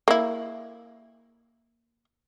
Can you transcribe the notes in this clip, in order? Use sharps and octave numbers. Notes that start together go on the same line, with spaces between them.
A#3 E4